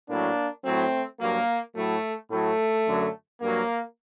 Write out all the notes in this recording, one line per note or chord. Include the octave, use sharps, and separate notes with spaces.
A2 F#3 A#3 D4
A2 F#3 A3 C4
G2 F#3 A#3
A2 F#3 A3
A2 F#3 A3
F#2 D3 F#3
G2 F#3 A#3